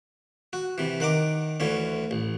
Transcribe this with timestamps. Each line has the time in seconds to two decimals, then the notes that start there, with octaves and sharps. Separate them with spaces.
0.53 F#4
0.78 C3 E3
1.00 D#3 F#5 A#5 D6
1.60 D2 D3 E3 C#4
2.11 A1